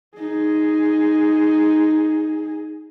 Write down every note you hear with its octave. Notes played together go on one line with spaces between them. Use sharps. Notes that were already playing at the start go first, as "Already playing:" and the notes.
D#4 G#4